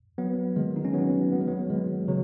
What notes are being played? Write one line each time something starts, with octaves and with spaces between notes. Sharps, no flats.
F#3 B3
D#3 G#3
D#4
C#4
F#3 B3
B3
G#3
F#3 B3
D#3 G#3
C#3 F#3